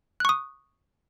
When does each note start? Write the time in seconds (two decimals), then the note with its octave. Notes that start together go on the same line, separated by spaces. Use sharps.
0.20 F#6
0.25 C#6
0.29 D#6